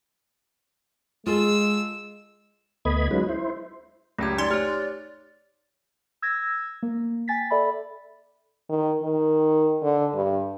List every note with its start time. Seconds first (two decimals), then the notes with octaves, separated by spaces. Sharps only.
1.27 G#3 F4 G#4 A4 E6
2.85 D2 A3 B3 D#5 B5 G#6
3.11 F#3 G#3 C#4 D#4 F4 B4
3.29 E4 C5
4.19 C#2 F#2 A3 G4 G#6
4.38 D#4 D5 C6
4.51 G4 C#5 F6
6.22 E6 G#6 A#6
6.83 A#3
7.28 G5 G#5 A6 B6
7.50 A4 D5 E5 B5
8.69 D#3
9.03 D#3
9.82 D3
10.15 G2